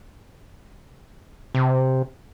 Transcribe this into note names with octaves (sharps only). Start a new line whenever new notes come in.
C3